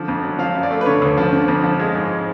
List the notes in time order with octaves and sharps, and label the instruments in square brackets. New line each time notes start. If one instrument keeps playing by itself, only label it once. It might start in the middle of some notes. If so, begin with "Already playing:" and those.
Already playing: [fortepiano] D3 F3
F2
F#3
F3 F5
F#2
D5
A3
B4
D3 C#5
D2
F3
D3
F2
F3
G#3
G#2